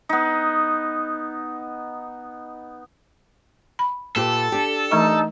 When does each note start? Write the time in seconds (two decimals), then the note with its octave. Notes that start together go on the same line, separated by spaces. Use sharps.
0.09 B3 D#4
3.79 B5
4.16 A#2 G4 A4 B4
4.52 D4 G4
4.91 E3 A3 D#4 C#6